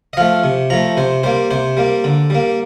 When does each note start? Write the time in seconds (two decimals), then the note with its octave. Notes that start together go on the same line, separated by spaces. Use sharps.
0.13 D#5
0.17 F3 A3 F5
0.44 C3
0.70 F3 A3 A#5
0.97 C3 C5
1.23 G3 A#3 C5
1.51 C3 C5
1.77 G3 A#3
2.04 D3
2.30 G3 A#3